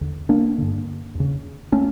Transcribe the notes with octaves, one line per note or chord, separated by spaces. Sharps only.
E2 D3
A#3 D4
G2 D3
E2 C#3
A3 C#4